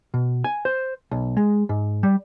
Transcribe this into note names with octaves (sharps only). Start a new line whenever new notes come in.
B2
G#5
C5
B1
G#3
G#2
G3